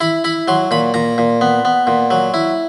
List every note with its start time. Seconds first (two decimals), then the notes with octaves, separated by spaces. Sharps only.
0.01 E4 B5
0.24 E4 B5
0.48 F#3 C6
0.71 A#2 B5
0.94 A#2 A#5
1.18 A#2
1.41 B3
1.65 B3
1.87 A#2
2.11 F#3
2.34 E4